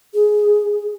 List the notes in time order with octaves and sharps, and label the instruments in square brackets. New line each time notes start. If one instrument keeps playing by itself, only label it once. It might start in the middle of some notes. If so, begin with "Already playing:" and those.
[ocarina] G#4